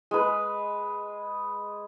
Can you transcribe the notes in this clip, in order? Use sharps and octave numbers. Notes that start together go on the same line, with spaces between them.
G#3 B4